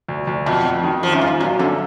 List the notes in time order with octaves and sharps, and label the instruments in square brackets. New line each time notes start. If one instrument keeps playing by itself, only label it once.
[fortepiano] D2
D2
[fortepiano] F2 [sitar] B2
[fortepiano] F2
D#3
[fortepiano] D#3 [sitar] F3
[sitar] F#2
[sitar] G#2 [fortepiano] F4
[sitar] A#2 [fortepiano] F#3
[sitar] F#2 [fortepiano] D3